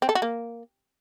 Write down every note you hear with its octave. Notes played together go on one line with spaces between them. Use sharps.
C4
A4
F#4
A#3